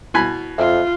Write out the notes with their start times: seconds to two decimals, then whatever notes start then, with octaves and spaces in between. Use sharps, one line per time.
0.14 B2 E4 G#5 B5
0.58 F2 F4 E5